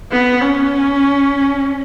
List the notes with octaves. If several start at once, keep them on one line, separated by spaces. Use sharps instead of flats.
B3
C#4